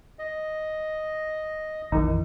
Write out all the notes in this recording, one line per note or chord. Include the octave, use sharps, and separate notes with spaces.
D#5
A#1 F2 D#3 E3 D#4